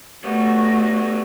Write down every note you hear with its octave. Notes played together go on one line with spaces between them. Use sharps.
G3 A3 B3 F#4